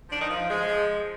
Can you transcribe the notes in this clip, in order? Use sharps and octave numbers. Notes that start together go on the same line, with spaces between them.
F3 D4
D#4
F3
F3 G#3
F3